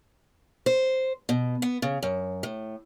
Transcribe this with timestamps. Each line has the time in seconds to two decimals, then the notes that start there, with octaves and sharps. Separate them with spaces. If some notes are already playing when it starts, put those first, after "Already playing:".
0.66 C5
1.29 B2
1.62 B3
1.82 C#3
2.03 F#2
2.43 A2